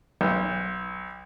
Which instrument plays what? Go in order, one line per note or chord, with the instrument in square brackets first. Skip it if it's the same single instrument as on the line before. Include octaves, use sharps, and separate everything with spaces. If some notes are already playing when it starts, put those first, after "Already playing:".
[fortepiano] B1